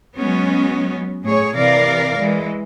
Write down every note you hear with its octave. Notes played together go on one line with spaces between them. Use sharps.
F#3 G#3 B3 C#4
A2 G#4 C#5
C3 E3 A#4 D5 F5
E3 G#3